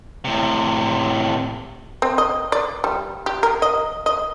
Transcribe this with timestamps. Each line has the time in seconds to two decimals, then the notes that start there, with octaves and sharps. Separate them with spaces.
0.25 A2 C3
2.02 C4
2.18 D#5
2.52 D5
2.84 G3
3.26 G4
3.43 A#4
3.62 D#5
4.06 D#5